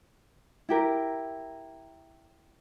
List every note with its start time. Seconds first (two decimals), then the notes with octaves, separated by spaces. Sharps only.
0.69 E4 G4 A#4